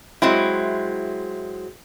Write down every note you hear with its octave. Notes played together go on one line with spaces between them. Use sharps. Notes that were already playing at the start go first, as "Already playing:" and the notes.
F#3 G#3 C4 E4